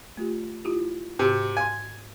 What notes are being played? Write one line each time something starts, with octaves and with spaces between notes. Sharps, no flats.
A3 F4 G4
E4 F4 G4
G#2 C3 F#4
F5 G#5 C6